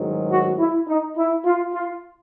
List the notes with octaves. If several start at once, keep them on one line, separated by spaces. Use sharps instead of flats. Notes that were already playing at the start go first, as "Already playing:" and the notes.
Already playing: A1 G#2 D#3 F#3
F#4
E4
D#4
E4
F4
F4